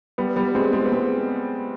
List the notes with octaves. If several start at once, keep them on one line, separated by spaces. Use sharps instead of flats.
G3 B3
G3 B3
G#3 C4
G#3 C4
B3
G#3 C4